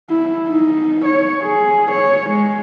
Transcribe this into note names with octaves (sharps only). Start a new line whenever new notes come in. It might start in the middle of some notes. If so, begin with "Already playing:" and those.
E4
D#4
C#5
G#4
C#5
G#3